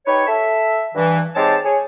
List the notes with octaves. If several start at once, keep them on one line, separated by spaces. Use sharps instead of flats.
D#4 G4 B4 C#5
A4 E5
G2 E3
G#2 G#3 C4 G4 C#5 A5
G#4 C#5